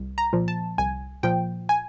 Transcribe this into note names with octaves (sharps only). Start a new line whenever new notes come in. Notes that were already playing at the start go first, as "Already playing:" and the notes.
Already playing: C2
A#5
A#2 F3
A5
C2 G#5
A#2 F3 G5
G#5